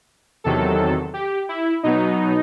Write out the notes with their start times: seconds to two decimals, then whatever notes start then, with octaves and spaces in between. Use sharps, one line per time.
0.44 E2 C3 D#3 F#3 A4
1.14 G4
1.49 E4
1.83 B2 F#3 B3 D#4